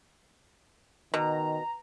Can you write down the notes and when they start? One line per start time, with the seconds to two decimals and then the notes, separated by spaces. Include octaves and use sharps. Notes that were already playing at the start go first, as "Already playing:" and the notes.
1.14 B2 D#3 A#5